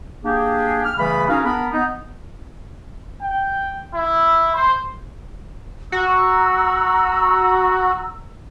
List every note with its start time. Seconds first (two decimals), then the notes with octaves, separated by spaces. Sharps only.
0.24 A#3 D4 G4 G#4
0.84 F6
0.98 C#3 E3 G3 A3 B3 B5
1.29 C#4 D#4 F#4 G#4 A#4 F5
1.45 B3 D4 A#4 B5
1.73 B3 D#4
3.21 G5
3.94 E4
4.54 C5
5.92 F#4 A#5 E6